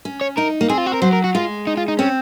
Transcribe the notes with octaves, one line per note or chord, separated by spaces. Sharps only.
C#4
C#5
D#4 A#4
A#3
C4 G#4
F4
F#4
A#4
F#3 C5
A#4
F#4
G#3 F4
D#4
F4
D#4
C4 C#4